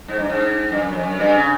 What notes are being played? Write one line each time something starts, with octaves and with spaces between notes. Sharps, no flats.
G#2
G2
G#2
G2
F#2
F2
F#2
G2
C#3